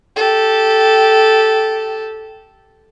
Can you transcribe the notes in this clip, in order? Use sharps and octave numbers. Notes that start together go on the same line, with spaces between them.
G4 A4